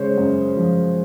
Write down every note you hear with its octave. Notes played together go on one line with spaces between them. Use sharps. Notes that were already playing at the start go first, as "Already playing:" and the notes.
Already playing: C#3 G#3 C5 C#5
F#2
F3